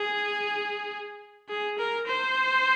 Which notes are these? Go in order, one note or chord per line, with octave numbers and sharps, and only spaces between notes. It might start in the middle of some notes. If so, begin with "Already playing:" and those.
Already playing: G#4
G#4
A#4
C5